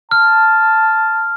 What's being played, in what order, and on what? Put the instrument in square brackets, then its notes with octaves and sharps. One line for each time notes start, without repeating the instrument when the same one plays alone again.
[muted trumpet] A5 [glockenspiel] F6